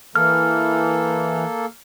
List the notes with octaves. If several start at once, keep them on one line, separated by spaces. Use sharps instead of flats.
E3 A#3 A4 F6